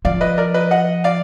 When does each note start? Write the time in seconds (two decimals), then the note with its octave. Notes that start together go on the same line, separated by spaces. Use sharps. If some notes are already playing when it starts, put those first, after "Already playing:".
0.05 F3 D5 F5
0.21 B4 D#5
0.38 A#4 D5
0.54 B4 D#5
0.71 D#5 F#5
1.04 D5 F5